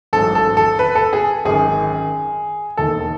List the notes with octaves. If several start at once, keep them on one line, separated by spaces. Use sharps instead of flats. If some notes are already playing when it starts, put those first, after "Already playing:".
A1 G#2 F#3 A4
A4
A4
B4
A4
G#4
G#1 F#2 D#3 G#4
E1 D#2 D#3 A4